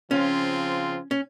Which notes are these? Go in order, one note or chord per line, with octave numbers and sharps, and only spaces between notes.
C#3 F3 C4 C#4 F4
C#4